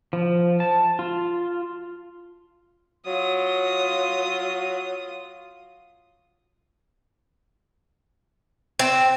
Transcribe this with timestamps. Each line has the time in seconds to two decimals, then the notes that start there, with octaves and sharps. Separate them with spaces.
0.13 F3
0.60 A5
0.99 F4
3.06 F#3 F4 D#6
8.79 C4